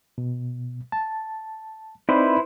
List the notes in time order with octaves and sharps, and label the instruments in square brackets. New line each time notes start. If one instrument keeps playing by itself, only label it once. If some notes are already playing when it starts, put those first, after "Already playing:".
[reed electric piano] B2
A5
[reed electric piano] C4 D#4 D5 [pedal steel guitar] E4 B4 C5